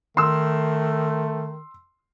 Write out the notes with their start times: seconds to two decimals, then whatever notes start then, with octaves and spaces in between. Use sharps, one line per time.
0.17 D#3 A3 C6 E6